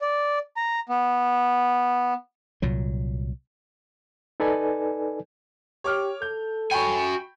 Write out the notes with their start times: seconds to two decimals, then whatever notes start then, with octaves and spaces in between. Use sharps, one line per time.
0.01 D5
0.57 A#5
0.89 B3
2.62 C2 A#2 F#3
4.40 D#4 A4 B4 D5 G#5
5.84 G4 C#5 D6 F6
6.22 A4 G6
6.71 F#4 G5 G#5 B5 C#6